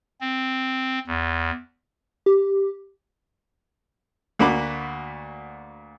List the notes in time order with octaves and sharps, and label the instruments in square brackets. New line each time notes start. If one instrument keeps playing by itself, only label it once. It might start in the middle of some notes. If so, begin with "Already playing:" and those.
[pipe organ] C4
E2
[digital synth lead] G4
[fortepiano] D2 A#3 F#4 B5 D6